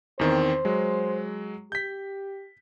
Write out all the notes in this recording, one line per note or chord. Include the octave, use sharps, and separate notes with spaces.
E2 D#3 C4 C5
F#3 G#3
G4 G6 B6